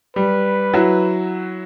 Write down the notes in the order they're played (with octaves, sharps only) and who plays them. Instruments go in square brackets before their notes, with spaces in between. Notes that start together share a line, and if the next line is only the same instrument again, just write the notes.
[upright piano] G3 [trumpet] B4
[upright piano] F#3 E4 F#4